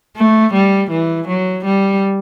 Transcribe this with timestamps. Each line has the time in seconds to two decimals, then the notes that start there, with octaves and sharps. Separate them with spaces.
0.16 A3
0.53 G3
0.90 E3
1.28 F#3
1.65 G3